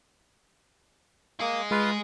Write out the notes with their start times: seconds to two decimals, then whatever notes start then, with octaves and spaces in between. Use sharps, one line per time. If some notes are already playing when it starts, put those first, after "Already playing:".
1.40 A#3 G#4 D#5
1.71 G#3 F4 B4 F5